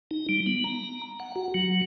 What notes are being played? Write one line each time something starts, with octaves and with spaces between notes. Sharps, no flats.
D#4
G3
B3
A#5
F#5
F#4
F#3